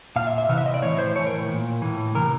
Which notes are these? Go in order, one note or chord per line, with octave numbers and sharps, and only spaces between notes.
A#2 F5
E5
E5
C3 E3 F5
E5
D#5
D5
A2 E3 C#5
C5
A2 E3 C#5
A#4
A#2
A2 E3
C3 E3 A#4